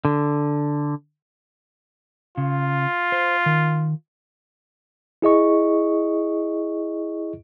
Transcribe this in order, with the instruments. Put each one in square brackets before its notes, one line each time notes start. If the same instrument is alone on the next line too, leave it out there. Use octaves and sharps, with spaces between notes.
[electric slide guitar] D3
[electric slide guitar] C#3 [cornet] F4
[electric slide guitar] C5
D#3
[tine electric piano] E4 G#4 D#5 C#6